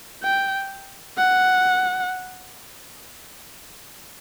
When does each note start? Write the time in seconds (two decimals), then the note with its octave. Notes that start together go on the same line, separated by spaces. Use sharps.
0.23 G5
1.18 F#5